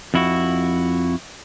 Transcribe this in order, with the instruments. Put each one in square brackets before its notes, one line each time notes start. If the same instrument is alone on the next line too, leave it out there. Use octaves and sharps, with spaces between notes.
[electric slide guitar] F2 E4 F#4